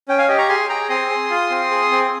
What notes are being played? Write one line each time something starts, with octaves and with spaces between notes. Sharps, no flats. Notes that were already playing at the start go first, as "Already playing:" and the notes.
C#4 G5
F5 G#5
G4 D#5 G5
A#5 C#6
G#4 G#5 C6
G#4 G5 A#5
C4 C6 D#6
G#4
F4
C4
G#4
C4